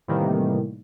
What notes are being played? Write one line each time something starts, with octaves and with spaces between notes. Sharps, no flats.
A2 C3 D#3 E3 G3 A#3